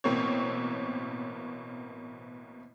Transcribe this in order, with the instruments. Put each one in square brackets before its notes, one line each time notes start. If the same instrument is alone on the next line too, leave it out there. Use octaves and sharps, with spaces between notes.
[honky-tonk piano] A1 B2 A#3 C4 C#5